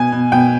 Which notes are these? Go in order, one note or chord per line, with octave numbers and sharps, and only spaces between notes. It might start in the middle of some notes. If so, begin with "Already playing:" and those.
Already playing: B2 G#5
B2
B2 G5